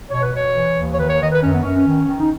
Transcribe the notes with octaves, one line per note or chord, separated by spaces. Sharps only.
B2 C#5
B4
B2 C#5
E3
D#2
C#5
D#3 B4
C#5
D#3 D#5
B4
F#2 C#4
B3
F#2 C#4
C#4
D#3
D#3
D#4